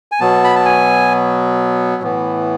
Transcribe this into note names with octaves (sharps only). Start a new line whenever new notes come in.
G#5
B2 F#3 B3 A5
B5
A5
G#5
A2 E3 B3